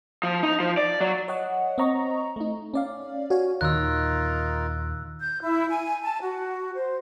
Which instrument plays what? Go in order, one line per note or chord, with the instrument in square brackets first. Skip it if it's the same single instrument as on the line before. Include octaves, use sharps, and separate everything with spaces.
[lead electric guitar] F3
D#4
F3
D5
F#3
[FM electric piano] C#5 D#5 F#5
C4 D#5 A#5 C#6
A3 D#4
C#4 D5 F5
F#4 C#5 F5 G#5
[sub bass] D#2 [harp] A#2 D#3 [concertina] D#4 F4 A#4 [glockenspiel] E6 F#6
[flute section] G6
E4
G#5
A5
F#4
C5